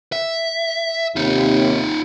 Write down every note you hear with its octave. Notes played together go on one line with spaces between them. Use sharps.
E5
D#2 C3 D#4 F4